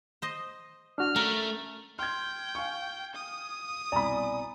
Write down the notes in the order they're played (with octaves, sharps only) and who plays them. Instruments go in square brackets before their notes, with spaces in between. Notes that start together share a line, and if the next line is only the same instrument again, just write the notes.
[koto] C5 D#5
[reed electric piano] D4 F#4 [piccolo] F6
[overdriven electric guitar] A3 [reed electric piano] C#4 [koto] A#4
[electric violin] G5 [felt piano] C6 G#6 [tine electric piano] F6
[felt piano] F5 G#5 C#6
[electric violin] D#6
[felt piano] C2 B2 B5 [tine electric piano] D5 G#5 A#5